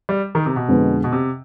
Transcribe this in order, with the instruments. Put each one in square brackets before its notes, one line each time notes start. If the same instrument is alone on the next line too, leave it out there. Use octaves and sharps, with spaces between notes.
[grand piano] G3
D#3
C3
B2
[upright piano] F2 D3 G#3 B3
[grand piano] B2
C3